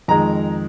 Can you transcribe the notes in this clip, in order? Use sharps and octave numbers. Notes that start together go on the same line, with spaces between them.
F2 D#3 G#3 A#5